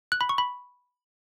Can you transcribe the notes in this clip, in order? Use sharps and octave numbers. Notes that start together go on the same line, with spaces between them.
F#6
B5
C#6
B5